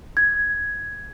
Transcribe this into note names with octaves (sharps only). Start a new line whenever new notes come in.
G#6